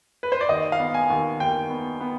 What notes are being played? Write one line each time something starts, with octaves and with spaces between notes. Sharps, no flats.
B4
C5
D5
D#2 D#5
F5
B3
G#5
D#2
D#2 G5
B3
B3